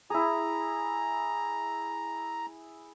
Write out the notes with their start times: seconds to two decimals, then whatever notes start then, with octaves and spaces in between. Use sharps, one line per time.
0.10 E4 G#4 A#5